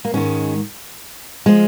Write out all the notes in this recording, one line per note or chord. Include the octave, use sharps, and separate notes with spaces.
A#3
G#2 D#3 G#3 C#4
F3 G#3